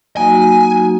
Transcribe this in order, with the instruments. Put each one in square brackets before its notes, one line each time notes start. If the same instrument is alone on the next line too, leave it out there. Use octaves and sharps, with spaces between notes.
[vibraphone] F#3 A#3 D#4 F#4 [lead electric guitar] G#5